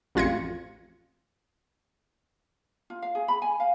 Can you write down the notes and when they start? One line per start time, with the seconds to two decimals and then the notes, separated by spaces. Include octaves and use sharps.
0.15 A1 F2 F4 G#6 A#6 C#7
2.90 F4
3.02 F5
3.15 G#4
3.28 B5
3.42 G#5
3.60 F5